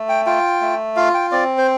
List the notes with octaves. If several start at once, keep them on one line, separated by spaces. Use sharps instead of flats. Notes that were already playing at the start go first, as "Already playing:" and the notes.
Already playing: A3
G5
F4 G5
A3
F4 F5
G5
C4 D5
C5